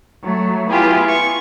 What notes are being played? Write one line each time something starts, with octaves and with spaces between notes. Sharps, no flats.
F#3 A3
B3 E4 F4 G4 G#4
C#6